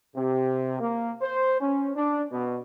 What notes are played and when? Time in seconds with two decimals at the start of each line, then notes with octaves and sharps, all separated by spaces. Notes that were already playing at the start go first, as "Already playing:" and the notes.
0.16 C3
0.80 A#3
1.21 C5
1.61 C#4
1.95 D4
2.32 B2